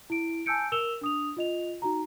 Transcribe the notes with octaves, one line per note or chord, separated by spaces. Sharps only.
E4 D7
G#5 A5 E6 G6 C#7 D7
A#4 E6 E7 F7 G7
D4 D#6 F7
F4 D#5 F7
D#4 F#4 A#5